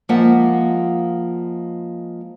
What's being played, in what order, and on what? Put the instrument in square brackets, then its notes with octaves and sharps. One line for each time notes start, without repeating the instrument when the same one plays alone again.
[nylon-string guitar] F3 G#3 A#3 F4 E5 F#5